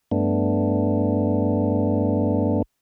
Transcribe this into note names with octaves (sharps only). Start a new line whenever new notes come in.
G2 A3 B3 D4